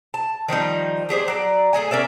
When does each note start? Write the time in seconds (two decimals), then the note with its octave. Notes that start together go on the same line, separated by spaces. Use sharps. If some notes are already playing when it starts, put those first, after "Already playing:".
0.14 A5
0.48 D#3 F3 G3 D#4
1.09 D4 G4 G#4 C5
1.28 F#3 D5
1.73 A3 G#4 D#5 G#5
1.91 C#4 A#4 D5 E5